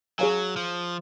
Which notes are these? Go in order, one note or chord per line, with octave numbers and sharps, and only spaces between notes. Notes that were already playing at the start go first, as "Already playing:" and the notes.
F#3 G#4 C#5 F5 G#5
F3